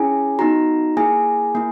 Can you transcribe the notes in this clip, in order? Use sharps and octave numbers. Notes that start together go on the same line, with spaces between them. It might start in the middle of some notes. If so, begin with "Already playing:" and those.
Already playing: C#4 E4 G#4 G#5
B3 D#4 F#4 A#5
A#3 E4 G#4 G#5
A#3 E4